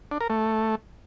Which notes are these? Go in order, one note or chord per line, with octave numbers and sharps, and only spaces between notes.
D4
A#4
A3